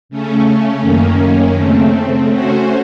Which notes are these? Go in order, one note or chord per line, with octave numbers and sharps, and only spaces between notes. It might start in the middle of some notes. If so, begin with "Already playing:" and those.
C#3 A3 C#4
F#2 D#3 A#3 C#4
C#3 A3 C4
A3 C#4 F#4 C5